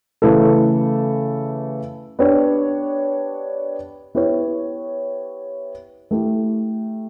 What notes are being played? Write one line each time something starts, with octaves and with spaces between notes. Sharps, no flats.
C#3 E3 A3 E4 A4
B3 D4 G4 C#5
B3 E4 G4 C#5
A3 E4 G4